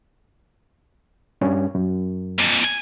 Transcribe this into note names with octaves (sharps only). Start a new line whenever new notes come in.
G2 C#4
F#2
F2 A#2
G#5